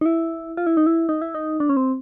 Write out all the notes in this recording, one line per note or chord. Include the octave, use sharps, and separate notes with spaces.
D#4
E4
F4
E4
D#4
E4
D#4
E4
D#4
D4
C#4
C4